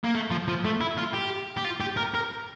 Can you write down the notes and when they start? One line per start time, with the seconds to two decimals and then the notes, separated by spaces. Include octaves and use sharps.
0.04 A#3
0.15 A3
0.31 F3
0.48 F3
0.65 A3
0.81 E4
0.97 F4
1.13 G4
1.57 G4
1.64 F4
1.80 G4
1.97 A#4
2.14 A#4